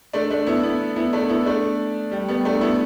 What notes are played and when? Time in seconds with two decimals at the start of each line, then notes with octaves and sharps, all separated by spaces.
0.13 A3 D4
0.30 A3 D4
0.47 B3 E4
0.63 B3 E4
0.96 B3 E4
1.13 A3 D4
1.29 B3 E4
1.46 A3 D4
2.12 G3
2.28 G3 B3
2.45 A3 D4
2.61 B3 E4